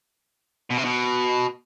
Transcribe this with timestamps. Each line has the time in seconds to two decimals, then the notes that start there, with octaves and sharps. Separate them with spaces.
0.71 B2
0.78 C3
0.85 B2